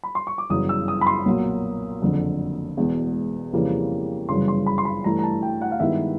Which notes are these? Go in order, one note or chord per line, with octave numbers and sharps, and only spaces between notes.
B5
C6
C#6
D6
G1 F#2 C#3 E3 D#6
E6
D#6
B5
C6
B1 A#2 F#3 A#3
F#1 F2 D3
E1 E2 B2 G#3
F2 C#3 E3 G3 A#3
G1 F#2 C#3 E3 C6
C6
B5
C6
B5
G2 E3 A3 A#5
A#5
A5
G5
F#5
F5
G2 D#3 G#3 B3 E4 E5